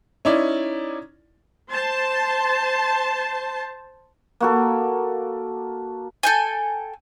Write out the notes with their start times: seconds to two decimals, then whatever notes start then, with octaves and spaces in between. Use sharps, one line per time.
0.25 C#4 D#4 E4 D5
1.69 C5 A5
4.40 A#3 F#4 A4
6.23 A4 G5 G#5